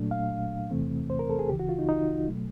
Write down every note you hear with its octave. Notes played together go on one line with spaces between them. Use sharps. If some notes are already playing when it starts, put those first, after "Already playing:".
Already playing: A#2 F#3 A3 D4
F5
E2 C3 E3 A3 C4
C5
A#4
A4
G#4
C#2 C#3 E3 G4
F#4
F4
D#4
D#4
B2 F#3 A3